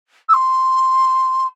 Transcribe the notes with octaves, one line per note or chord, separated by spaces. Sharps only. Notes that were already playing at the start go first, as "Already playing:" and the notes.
E6
C6